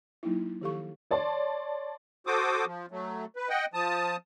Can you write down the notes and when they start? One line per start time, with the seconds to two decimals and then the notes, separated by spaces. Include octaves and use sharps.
0.23 F#3 A#3 D#4 E4
0.61 D#3 F3 G4 A4 F5 C#6
1.11 C#5 D5 A5 C6
2.27 F#4 A4 C5 D6 D#6
2.66 F3
2.91 F#3 A3
3.36 B4
3.49 D#5 F#5 G5
3.74 F3 A5 D#6